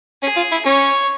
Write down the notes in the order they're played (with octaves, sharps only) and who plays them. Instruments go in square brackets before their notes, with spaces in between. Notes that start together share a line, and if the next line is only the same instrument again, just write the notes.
[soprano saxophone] C#4 [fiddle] G#4
[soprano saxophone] F4
E4
[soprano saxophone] C#4 [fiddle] C#5